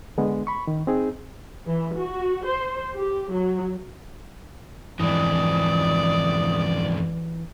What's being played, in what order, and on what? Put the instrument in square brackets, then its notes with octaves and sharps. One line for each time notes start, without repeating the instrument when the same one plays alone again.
[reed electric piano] D3 G#3 B3
B5 C#6
D#3
C4 D#4 G#4
[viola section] E3
F#4
C5
G4
F#3
[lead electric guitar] F2 G#2 [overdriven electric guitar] E3 [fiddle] D5 [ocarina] D#6